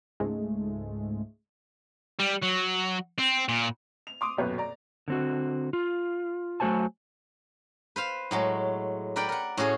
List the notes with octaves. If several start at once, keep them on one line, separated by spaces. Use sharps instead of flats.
C#2 G#2 G#3 A3
G3
F#3
C4
A#2
F7
C6 D6 D#6
D#1 F#2 B2 B4
D5 A#5
D3 C4 F#4
F4
F#3 A3 F#4 C5 G#5 A5
B4 C5 F5
A2 F#3 G#3
A#4 B4 D5 F#5 G5
A#4 F#5
A2 C#4 F#4 G#4